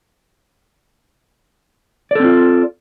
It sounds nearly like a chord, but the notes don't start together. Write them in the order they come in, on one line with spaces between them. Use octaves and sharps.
D5 A4 C4 F4